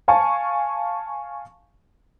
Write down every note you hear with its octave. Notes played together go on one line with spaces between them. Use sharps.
F5 G#5 A5 C#6